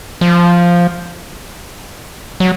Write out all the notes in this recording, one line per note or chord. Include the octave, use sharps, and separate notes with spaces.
F3
F#3